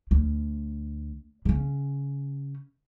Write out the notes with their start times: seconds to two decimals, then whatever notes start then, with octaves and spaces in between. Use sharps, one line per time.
0.11 D2
1.45 C#3 C#4